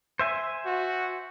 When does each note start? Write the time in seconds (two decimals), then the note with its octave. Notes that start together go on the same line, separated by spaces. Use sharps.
0.19 C5 E5 G#5
0.66 F#4